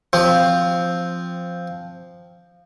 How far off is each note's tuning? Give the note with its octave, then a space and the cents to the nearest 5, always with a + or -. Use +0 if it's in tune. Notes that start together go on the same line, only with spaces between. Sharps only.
F3 +0 C4 +0